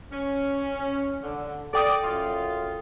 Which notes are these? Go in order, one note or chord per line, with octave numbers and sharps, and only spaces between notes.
C#4
D3
A4 D5 G5 D#6
F#2 F4